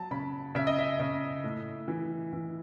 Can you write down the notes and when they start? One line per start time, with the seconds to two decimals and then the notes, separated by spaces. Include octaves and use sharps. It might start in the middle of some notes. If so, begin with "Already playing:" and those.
Already playing: F#3 A5
0.11 C#3 B5
0.55 C#3 E5
0.67 D#5
0.79 E5
0.99 C#3
1.44 A2
1.88 E3
2.33 E3